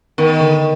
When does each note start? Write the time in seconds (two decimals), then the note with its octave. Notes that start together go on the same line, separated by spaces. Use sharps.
0.18 D#3 B3
0.40 D3